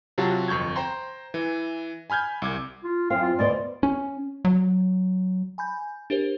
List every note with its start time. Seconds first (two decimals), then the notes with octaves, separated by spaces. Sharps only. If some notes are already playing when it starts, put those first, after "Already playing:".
0.18 C3 F#3 F4 F#4 A5
0.48 G1 F2 C#6 G6 G#6
0.76 C5 G5 A#5 C6
1.34 E3
2.10 G#5 B5 F6 G6 G#6
2.42 C2 D6 G#6
2.84 F4
3.10 F#2 C4 F5
3.22 F4
3.39 D2 B2 C5 D5
3.83 C#4
4.45 F#3
5.58 G#5 B5 G6
6.10 D4 G4 A#4 C5